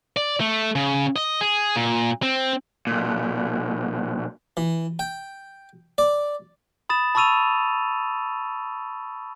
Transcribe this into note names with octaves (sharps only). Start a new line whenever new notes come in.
D5
A3
C#3
D#5
G#4
A#2
C4
B1 A#2
E3
G5
D5
B5 D#6 A6 E7
A5 B5 C#6 E6 D#7 F7